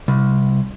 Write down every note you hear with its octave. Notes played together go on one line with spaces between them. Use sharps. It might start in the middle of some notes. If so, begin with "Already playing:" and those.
C2